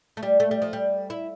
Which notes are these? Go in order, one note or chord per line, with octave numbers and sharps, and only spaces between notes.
A3
G3
A3
G3
F3
G3
E4